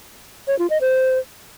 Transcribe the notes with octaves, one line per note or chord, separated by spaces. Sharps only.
C#5
F4
D#5
C5